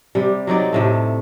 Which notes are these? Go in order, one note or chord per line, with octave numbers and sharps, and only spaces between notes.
C3 G3
F#3 C4 D#4 D5
A2 C3 A3